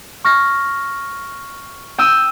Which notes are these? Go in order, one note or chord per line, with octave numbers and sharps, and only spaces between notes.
C#6 F6 A#6
G5 D#6 E6